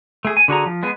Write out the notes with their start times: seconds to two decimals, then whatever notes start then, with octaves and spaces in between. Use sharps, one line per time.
0.25 A3 G#4
0.37 G#5
0.48 D3 F#4 G#4 A#5
0.66 F3
0.83 G#3 B3 G#4